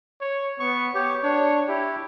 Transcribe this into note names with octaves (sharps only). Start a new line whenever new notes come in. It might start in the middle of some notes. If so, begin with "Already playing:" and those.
C#5
B3 C#6
G4 C#5
D4 C#5
E4 G4